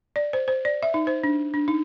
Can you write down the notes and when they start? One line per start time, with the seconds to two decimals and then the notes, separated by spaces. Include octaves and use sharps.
0.16 D5
0.33 C5
0.48 C5
0.65 D5
0.83 E5
0.94 D#4
1.07 C5
1.23 D4
1.54 D4
1.68 D#4